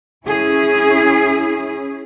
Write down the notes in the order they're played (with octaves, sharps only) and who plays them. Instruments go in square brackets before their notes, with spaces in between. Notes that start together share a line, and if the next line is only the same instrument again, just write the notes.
[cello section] C#4 E4 G#4